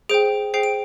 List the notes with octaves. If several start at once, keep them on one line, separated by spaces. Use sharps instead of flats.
G#4 C5 G5 D7
G#4 C5 G5 C7
D7